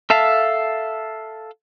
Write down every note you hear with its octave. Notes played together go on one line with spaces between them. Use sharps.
A4 E5 F5 A5